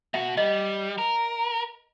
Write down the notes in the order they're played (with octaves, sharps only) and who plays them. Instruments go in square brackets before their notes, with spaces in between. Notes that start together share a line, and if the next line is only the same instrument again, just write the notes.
[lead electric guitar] B2 F#4 [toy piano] E5
[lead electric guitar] G3 [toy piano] D#5
[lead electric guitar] A#4